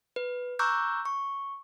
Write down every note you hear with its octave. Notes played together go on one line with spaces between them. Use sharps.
B4
A#5 C#6 D6 E6 F#6 G6
C#6